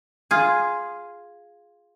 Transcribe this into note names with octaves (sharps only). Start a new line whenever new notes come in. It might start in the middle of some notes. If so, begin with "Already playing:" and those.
F4 G#4